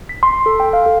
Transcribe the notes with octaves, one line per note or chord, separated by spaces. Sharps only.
B6
C6
A4
G5
F5
A4